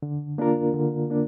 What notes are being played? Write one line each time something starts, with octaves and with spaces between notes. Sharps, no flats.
D3
A#3 D4 F4 A#4
D3
A#3 D4